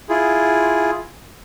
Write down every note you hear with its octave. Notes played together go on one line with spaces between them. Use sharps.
E4 F4 G#4